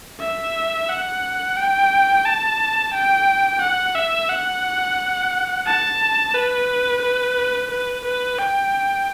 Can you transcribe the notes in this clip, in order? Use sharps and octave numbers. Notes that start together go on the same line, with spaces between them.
E5
F#5
G5
A5
G5
F#5
E5
F#5
A5
B4
B4
B4
B4
G5